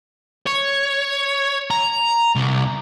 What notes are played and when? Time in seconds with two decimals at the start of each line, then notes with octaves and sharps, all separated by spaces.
0.47 C#5
1.71 A#5
2.35 C2